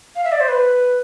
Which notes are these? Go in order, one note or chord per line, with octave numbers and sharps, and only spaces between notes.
F5
E5
D5
C5
B4